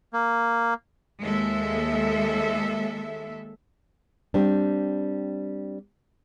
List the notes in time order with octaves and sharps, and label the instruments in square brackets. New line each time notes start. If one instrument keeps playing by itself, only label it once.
[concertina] A#3
[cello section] D#2 G#3 A4 E5
[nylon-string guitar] G3 C4 D4